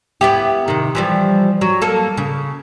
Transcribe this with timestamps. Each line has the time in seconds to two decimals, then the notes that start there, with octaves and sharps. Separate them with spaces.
0.21 B3 E4 G4
0.68 C3 D#3
0.95 E3 F3 G3
1.61 F#3
1.82 A#3 A4
2.17 C#3